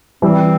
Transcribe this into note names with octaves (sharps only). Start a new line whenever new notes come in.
E3 G3 C4